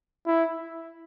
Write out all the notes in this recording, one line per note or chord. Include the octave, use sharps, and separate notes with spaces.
E4